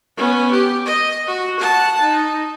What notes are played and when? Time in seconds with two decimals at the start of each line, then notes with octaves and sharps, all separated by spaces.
0.17 B3 C#4
0.51 G4
0.86 D#5
1.27 F#4
1.60 F#5 A5
2.00 D#4